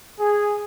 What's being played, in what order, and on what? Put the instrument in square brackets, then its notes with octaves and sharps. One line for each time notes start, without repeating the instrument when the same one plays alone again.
[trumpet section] G#4